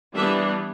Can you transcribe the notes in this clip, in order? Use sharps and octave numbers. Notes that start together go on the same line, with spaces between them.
E3 G3 B3 D4 E5